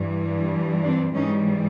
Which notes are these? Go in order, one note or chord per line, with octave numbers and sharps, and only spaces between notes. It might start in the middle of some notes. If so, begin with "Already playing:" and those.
Already playing: G2 E3 G3
C4 D4
G#2 E3 G3 C#4 D#4